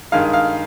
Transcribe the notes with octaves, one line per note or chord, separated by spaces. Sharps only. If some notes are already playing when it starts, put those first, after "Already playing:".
G2 D#3 G#3 D#4 F5
F5